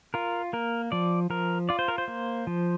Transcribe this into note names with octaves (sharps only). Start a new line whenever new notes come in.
F4 A#4
A#3 A#4
F3 D5
F3 A#4
F4 D5
C5
A#4
C5
A#3
F3